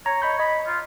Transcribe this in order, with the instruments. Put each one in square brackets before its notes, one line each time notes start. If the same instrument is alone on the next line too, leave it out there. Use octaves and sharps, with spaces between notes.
[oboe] C#5 [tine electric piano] A#5
[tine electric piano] D#5 B5 G6
[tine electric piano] D#5 [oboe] B5
[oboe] F4